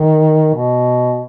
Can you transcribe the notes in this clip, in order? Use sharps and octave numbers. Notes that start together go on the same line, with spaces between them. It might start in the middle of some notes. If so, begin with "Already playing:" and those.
Already playing: D#3
B2